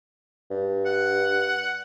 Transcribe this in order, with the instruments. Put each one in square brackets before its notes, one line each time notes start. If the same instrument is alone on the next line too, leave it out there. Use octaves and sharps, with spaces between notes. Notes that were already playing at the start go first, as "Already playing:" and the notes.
[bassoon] G2
[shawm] F#5